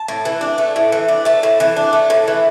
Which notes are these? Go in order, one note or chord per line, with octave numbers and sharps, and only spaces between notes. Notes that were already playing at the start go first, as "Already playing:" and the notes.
Already playing: A5
A2
E3
D4
A3
A2
E3
D4
A3 A5
A2
E3
D4
A3
A2
E3